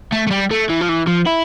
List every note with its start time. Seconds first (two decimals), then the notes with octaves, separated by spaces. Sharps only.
0.12 A3
0.27 A3
0.31 G3
0.51 A3
0.69 E3
0.81 F3
0.89 E3
1.07 F3
1.27 E4